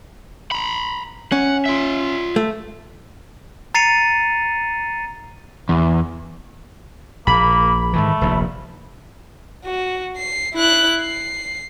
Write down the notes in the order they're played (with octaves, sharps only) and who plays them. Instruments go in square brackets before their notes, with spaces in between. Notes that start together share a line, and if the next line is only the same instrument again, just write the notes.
[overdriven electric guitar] A#5 B5
[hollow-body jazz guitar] C#4 [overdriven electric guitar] F#5
[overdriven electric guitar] F4 E5
[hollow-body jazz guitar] A3
[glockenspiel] A#5 A6 C7 C#7 D#7 F7
[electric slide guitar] E2
[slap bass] A#1 [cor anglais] A#3 [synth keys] B5
[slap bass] G#2 D#3 E3 [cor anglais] A3
[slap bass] F1 A#1 D#2
[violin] F#4
C7
E4 F#6
C7